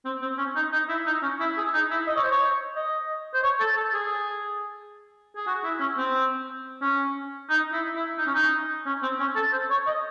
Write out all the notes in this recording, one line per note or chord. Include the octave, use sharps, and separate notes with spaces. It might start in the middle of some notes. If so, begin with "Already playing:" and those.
C4
C4
C#4
D#4
D#4
E4
D#4
C#4
E4
G#4
D#4
E4
D#5
C#5
C5
C#5
D#5
C5
C#5
A4
A4
G#4
G#4
F#4
E4
C#4
C4
C#4
D#4
E4
E4
D#4
C#4
D#4
C#4
C4
C#4
A4
C5
C#5
D#5